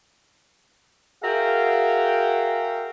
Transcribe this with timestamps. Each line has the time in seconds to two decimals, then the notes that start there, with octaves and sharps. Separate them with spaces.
1.23 F#4 G#4 A#4 E5 F5 G5